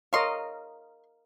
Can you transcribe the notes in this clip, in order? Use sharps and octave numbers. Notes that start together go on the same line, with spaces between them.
A#4 C#5 D#5 F5 C6